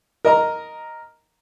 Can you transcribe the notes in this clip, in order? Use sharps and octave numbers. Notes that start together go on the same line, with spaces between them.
A#4 D#5 A#5